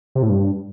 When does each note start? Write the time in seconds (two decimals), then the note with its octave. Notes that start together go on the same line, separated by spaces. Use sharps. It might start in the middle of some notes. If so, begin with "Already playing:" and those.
0.15 C3
0.23 A2
0.30 G2